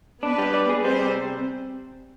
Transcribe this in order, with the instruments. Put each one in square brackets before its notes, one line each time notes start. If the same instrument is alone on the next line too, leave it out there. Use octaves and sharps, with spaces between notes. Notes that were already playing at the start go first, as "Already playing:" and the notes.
[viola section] B3 B4 [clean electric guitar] D4
[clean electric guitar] G3
D5
G#4
[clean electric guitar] G3 [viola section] C4 C5
[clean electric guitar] C3